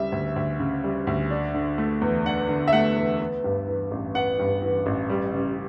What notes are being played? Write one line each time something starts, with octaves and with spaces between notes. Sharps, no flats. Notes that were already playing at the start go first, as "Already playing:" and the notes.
Already playing: D2 C#3 G3 E5
D2
D2
C#3
G3
D2
D4
D3
A3
E2
D4 F#5
D3
E5
A3 F#5
E2
B3
G2
E3
A1
B3 F#5
G2
E3
A1
G3
C#3